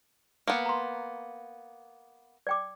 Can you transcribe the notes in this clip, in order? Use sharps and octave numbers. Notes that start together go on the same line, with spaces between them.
A#3 B3 G#5
A#5 C6
D5 G5 D6